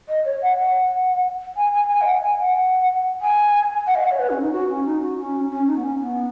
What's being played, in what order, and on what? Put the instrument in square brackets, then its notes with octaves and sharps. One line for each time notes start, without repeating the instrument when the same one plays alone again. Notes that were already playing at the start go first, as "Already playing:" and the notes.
[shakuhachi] D#5
C#5
F#5
F#5
G#5
G#5
G#5
D#5
F#5
G#5
F#5
G#5
F#5
D#5
F#5
C#5
B4
C#4
D#4
F#4
C#4
D#4
F#4
C#4
C#4
D#4
B3
C#4
B3